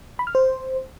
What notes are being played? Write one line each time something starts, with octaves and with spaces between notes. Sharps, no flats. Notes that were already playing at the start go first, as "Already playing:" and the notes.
B5
F6
C5